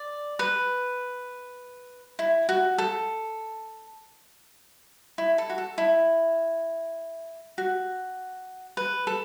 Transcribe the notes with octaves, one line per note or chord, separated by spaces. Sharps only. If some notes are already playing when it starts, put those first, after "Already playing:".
Already playing: D5
B4
E4
F#4
A4
E4
A4
F#4
A4
E4
F#4
B4
A4